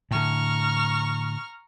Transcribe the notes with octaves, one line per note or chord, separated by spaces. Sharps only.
A2 D3 A#5 C#6 F6